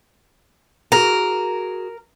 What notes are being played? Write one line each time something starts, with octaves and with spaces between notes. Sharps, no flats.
F#4 G#4 A#4